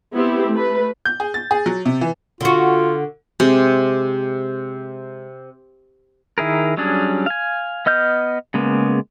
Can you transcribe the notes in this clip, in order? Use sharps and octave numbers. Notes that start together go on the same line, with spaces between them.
B3 C4 E4 G4
A3 B4
G6
G#4
A6
G#4
F#3
C3
E3
D3 F4 F#4
C3 G#3
D#3 E4 G#4 A#4
F#3 G3 C#4 D4 G#4
F5 G#5
B3 D#5 F6 G6
C#3 G#3 A#3 B3